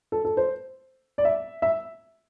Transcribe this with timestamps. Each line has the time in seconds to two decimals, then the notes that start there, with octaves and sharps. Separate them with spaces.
0.12 A4
0.25 A4
0.37 C5
1.18 D5
1.25 E5
1.62 E5